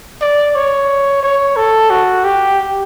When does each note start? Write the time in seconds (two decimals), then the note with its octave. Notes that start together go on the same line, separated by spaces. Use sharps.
0.21 D5
0.55 C#5
1.23 C#5
1.56 A4
1.90 F#4
2.24 G4